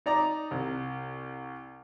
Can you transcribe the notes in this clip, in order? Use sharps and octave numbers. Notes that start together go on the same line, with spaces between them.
D#4 D5 A#5
C2